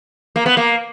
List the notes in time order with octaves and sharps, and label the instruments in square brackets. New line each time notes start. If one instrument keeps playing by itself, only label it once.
[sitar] A#3
B3
A#3